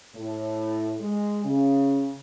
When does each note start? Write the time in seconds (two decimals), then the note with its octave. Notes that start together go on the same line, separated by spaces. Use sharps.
0.16 A2
1.00 G#3
1.45 C#3